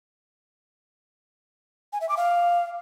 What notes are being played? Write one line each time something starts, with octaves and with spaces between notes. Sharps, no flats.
G#5
E5
D6
F5